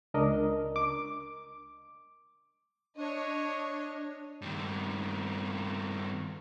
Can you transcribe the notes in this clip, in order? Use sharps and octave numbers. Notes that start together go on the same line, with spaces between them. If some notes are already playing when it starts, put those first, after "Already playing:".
C#2 D4 A#4 D#5
D6
D4 C#5 D#5
G2 D#3